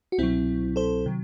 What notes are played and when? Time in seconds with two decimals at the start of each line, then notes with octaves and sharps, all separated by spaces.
0.12 F#4
0.18 C2 B2 F#3 C4 E4
0.76 A4 C5
1.06 C3 D#3 F#3